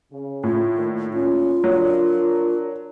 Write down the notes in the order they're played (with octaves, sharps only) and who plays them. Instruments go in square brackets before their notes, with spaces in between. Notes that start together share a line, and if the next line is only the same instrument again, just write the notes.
[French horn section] C#3
[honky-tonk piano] A2 [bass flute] F4
[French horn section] A#2 D#3
[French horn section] A#2 C#4 [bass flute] F4
[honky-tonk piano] F#3 [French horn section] D4 A#4